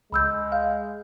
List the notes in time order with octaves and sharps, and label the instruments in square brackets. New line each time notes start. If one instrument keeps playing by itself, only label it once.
[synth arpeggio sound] C#2 [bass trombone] G#3 [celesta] B5 E6 G6
[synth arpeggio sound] F5